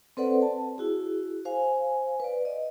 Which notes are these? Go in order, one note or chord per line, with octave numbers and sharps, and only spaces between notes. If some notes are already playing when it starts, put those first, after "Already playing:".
C4 A4 B4 C5 D5 F#5
A5
E4 F#4 G#4
C5 F5 G#5
B4 D5
D#5